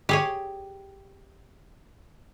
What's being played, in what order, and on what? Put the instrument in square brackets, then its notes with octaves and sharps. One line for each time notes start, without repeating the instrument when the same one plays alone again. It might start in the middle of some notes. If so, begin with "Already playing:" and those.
[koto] G4 G#4 C#5